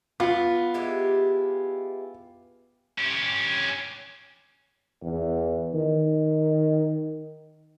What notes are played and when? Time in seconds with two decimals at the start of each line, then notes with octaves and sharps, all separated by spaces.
0.20 B3 F4
0.74 G#3 E4 G4
2.98 C#4 G4
5.03 E2
5.74 D#3